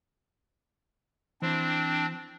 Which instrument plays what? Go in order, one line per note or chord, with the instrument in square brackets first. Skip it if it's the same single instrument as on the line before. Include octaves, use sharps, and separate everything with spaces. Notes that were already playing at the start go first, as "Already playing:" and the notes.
[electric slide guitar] E3 C5 [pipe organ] C4 D4